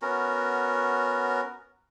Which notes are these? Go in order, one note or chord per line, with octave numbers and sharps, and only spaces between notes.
B3 C#4 F#4 A#4